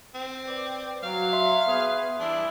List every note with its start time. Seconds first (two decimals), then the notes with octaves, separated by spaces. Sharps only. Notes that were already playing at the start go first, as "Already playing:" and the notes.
0.14 C4
0.47 B4 D5
1.03 F#3 F5
1.33 E5 C6
1.67 B3 G#4 B4
2.20 E3 G3 D4 E4